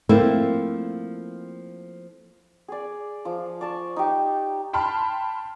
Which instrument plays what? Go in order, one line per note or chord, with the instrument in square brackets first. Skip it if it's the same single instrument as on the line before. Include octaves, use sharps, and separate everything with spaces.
[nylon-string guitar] F3 A3 A#3 C4 E4
[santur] G#4 D5
F3 D6
D5 A5 C#6
D#4 G4
[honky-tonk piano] G5 A5 B5 C6 F6